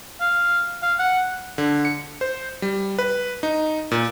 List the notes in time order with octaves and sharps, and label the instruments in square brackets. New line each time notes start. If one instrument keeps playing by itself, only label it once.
[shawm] F5
F5
F#5
[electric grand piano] D3
C#7
C5
G3
B4
D#4
A#2